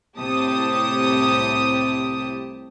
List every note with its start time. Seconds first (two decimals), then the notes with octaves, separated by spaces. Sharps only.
0.16 C2 A2 C3 G4 A5 D#6